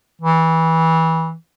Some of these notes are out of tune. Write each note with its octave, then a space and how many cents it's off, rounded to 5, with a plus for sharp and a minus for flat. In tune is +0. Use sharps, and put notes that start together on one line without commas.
E3 -20